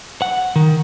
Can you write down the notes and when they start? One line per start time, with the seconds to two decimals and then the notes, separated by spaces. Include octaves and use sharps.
0.22 F#5
0.56 D#3